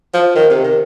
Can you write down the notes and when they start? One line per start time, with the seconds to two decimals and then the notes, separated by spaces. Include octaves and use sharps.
0.14 F3
0.35 D#3
0.50 C3
0.64 D#3